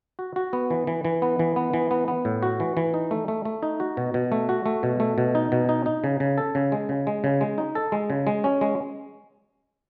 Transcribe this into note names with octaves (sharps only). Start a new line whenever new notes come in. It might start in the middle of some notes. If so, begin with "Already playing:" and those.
F#4
F#4
B3
E3
E3
E3
B3
E3
B3
E3
B3
B3
A2
F#4
E3
E3
D#4
A3
A3
A3
D#4
F#4
B2
B2
A3
F#4
A3
B2
A3
B2
D#4
B2
D#4
D#4
C#3
C#3
A4
C#3
G#3
C#3
G#3
C#3
G#3
D#4
A4
G#3
C#3
G#3
C#4
G#3